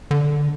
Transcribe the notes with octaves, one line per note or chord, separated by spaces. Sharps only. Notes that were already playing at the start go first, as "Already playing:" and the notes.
D3